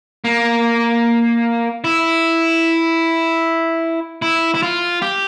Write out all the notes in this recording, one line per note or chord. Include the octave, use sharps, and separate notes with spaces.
A#3
E4
E4
E4
F4
G4